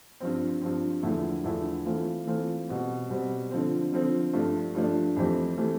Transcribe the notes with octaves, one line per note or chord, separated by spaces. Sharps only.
G2 F3 C4
G2 F3 C4
E2 D3 F3 A3 E4
E2 D3 F3 A3 E4
E3 A3 C4 F4
E3 A3 C4 F4
B2 G3 C4
B2 G3 C4
D3 F3 C4
D3 F3 C4
G2 F3 A3 D4
G2 F3 A3 D4
F2 E3 A3 C4 G4
E3 A3 C4 G4